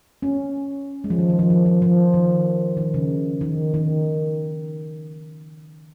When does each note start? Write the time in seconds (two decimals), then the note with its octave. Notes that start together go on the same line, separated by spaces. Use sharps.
0.22 C#4
1.04 G#3
1.10 F3
1.18 D#3
1.29 D#3
1.39 F3
1.50 F3
1.66 F3
1.82 F3
2.14 D#3
2.77 D#3
2.94 C#3
3.41 D#3
3.74 D#3